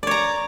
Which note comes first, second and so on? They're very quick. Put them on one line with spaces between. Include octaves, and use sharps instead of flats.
D5 C#5 A#5